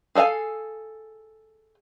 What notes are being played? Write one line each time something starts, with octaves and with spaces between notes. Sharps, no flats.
G#4 A4 D#5 F5 G#5